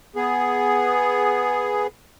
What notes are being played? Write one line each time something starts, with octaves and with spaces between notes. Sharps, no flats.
B3 G#4